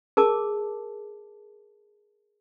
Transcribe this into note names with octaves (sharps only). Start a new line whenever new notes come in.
G#4 A#4 A5 D6